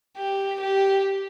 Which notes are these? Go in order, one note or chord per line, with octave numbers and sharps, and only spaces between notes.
G4
G4